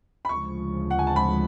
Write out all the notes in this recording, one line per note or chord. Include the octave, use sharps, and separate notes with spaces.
B5
D2 C#3 F3 G#3 C#6
F#5
G#5
A5
B5